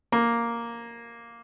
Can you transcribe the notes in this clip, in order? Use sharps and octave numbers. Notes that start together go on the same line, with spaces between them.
A#3